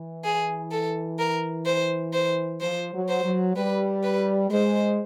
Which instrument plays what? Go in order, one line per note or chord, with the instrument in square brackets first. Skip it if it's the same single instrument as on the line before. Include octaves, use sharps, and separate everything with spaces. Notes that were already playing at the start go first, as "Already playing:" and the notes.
Already playing: [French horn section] E3
[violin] G#4
A4
A#4
C5
C5
[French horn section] F3 [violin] C5
[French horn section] F#3
[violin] C5
[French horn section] F#3
[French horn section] G3 [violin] B4
[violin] B4
[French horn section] G#3 [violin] C5